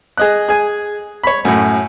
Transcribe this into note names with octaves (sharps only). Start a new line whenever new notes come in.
G#4 D#5 F#6
G#4 G#5
C#5 B5
F#2 A2